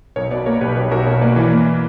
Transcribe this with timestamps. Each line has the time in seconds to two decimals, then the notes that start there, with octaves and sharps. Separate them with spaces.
0.16 B1 A#4 C#5
0.31 B2 B4 D5
0.46 A#3 A#4 C#5
0.61 B1 G4 B4
0.76 B1 G4 B4
0.91 B1 F#4 A#4
1.06 B2 A#4 C#5
1.21 A#3 B4 D5
1.36 E3
1.52 A#3